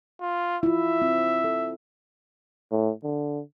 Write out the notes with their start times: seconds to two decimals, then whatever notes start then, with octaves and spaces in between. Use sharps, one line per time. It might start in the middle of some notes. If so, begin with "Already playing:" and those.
0.21 F4
0.63 E4 F4 E5
1.02 C4
1.44 A4
2.71 A2
3.03 D3